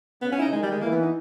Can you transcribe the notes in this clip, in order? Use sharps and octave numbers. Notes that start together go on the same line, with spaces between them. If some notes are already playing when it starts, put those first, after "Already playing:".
C#3 B3
C#4
E4
D#4
D#3 G#3
G3
G#3
E3 A#3
B3
D#4